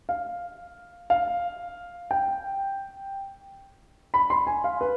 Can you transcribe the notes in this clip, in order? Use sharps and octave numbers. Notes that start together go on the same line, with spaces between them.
F5
F5
G5
B5
C6
G#5
F5
B4